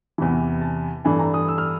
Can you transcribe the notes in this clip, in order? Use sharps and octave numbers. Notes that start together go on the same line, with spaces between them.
E2 C3 E3
A5
G2 E3 A3 D4 G#5
A#5
D#6
E6
F6